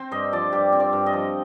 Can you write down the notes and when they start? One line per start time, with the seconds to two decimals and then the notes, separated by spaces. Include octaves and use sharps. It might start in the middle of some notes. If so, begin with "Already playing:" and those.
Already playing: C4 C5
0.11 G2 D#5
0.33 F3 D5
0.52 G2 G4
0.72 C4
0.80 D5
0.93 G2
1.06 D#5
1.13 F3